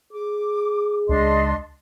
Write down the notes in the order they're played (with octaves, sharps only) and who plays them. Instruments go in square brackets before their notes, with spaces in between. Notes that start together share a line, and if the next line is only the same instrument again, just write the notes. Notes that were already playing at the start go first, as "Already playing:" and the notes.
[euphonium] G#4 [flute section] D6
[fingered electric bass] C#2 G#3 [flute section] D4 D#5 C6